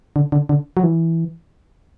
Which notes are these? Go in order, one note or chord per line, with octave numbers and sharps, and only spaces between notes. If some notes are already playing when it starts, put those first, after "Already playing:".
D3
D3
D3
F#3
E3